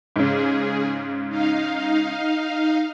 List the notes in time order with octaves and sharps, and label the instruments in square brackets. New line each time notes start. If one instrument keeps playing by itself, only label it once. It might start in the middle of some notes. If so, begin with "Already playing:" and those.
[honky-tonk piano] G#2 C#3 [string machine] G#4
[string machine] D#4 F5